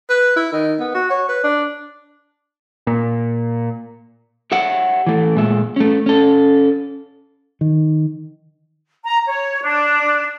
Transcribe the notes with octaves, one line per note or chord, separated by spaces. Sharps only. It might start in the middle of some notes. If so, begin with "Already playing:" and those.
B4
E4
D#3
B3
F#4
C#5
B4
D4
A#2
G4 C#5 E5 F#5
E3 A3
A#2 G#3 E5
A3 C#4
C#4 A4
D#3
A#5
C#5
D4